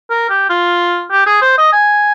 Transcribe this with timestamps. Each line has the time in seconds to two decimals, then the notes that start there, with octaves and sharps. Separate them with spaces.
0.10 A#4
0.30 G4
0.50 F4
1.11 G4
1.26 G#4
1.42 C5
1.58 D#5
1.73 G#5